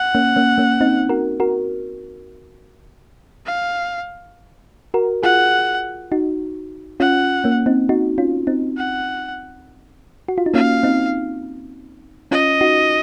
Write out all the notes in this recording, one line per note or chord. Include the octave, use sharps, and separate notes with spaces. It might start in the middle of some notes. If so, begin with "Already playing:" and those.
Already playing: F#5
A#3 C#4
A#3 C#4
A#3 C#4
C4 D#4
F#4 A#4
F#4 A#4
F5
F#4 A#4
F4 G#4 F#5
D#4 F#4
C#4 F4 F#5
A#3 C#4
C4 D#4
D#4 F#4
C#4 F4
C4 D#4
F#5
F#4
F4
D#4
A#3 C#4 F5
C4 D#4
C#4 F4 D#5
D#4 F#4